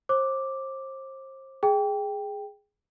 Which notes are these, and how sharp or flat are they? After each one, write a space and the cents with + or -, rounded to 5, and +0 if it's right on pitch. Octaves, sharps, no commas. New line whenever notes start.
C5 +35 D6 +0
G#4 +0 G5 +5